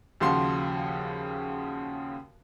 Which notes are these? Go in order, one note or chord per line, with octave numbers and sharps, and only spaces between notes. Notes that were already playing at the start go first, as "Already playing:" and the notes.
D#2 C#3 F3 F#4 C6